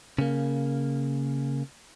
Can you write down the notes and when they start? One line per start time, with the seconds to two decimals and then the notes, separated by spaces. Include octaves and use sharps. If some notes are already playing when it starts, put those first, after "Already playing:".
0.19 C#3 A#3